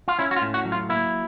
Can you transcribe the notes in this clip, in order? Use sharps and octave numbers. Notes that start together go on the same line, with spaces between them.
F4
C#4 E4
F#4
F4
A2
F#4
F#3
F4
A#3 E4